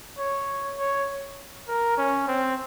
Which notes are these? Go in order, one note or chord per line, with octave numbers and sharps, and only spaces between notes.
C#5
C#5
A#4
C#4
C4